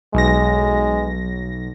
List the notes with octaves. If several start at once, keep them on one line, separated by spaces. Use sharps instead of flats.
B1 G#3 A#6